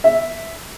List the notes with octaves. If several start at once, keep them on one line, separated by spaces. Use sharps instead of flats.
E5